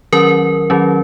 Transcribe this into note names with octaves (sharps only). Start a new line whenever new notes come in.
D#3 F#3 C#4 A#4
D#3 F#3 C#4